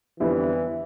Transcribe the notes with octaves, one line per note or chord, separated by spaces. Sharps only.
F2 D3 E3 G3 B3 E4